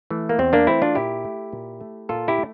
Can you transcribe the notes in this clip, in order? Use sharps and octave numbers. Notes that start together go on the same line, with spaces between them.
E3 A3
A#3
E2 C4
A#3 D4
E3 A3 C4 E4
D4 F4
A#2 E4 G4
A3
A#2
A3
A#2 F4 A4
E4 G4
A3